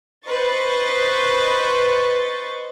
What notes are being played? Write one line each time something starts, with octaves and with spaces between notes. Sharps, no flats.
B4 C5 D#5 C#6 A6